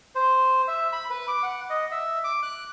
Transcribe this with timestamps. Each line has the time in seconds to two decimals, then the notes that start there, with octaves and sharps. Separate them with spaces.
0.15 C5
0.68 E5
0.93 B5
1.10 B4
1.28 D6
1.43 F#5
1.70 D#5
1.91 E5
2.24 D6
2.43 F#6